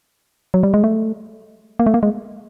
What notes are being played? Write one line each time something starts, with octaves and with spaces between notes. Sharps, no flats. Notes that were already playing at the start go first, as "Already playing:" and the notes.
F#3
G3
G#3
A3
A#3
A3
A#3
G#3